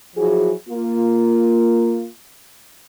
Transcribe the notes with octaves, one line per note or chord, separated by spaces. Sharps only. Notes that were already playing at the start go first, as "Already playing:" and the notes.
F3 F#3 E4 F#4 G#4
A#3 F4